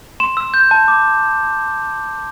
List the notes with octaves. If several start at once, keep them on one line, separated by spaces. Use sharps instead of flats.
C6 E7
E6
G6
A5
D6